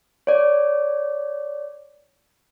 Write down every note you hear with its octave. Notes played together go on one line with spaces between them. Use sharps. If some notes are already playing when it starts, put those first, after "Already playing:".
C#5 D5